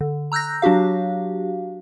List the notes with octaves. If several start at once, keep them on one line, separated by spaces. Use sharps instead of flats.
D3
A#5 E6 F#6 G6 A#6
F#3 D4 F#4 G4 F5